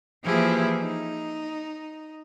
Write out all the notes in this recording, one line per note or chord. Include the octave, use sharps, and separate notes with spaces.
E3 F3 A#3 E4 G4 G#4
D#4